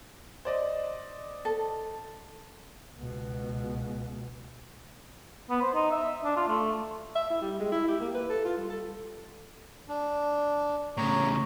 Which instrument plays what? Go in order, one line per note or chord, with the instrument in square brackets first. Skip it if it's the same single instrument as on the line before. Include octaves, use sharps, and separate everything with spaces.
[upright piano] C5 D5 D#5
[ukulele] A4
[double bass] C#2 B2
[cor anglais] B3
C5
D#4
E5
D4
F4
A3
[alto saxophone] E5
E4
G3
G#3
E4
G4
A#3
B4
A4
F4
G3
A4
[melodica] D4
[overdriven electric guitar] A2 C#3 [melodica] C#5 A#5 C#6